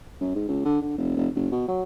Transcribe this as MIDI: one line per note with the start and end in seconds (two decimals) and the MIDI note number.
0.21 0.34 42
0.35 0.45 44
0.48 0.61 37
0.65 0.81 50
0.81 0.96 50
0.97 1.12 29
1.16 1.28 29
1.35 1.47 30
1.52 1.66 47
1.68 1.83 54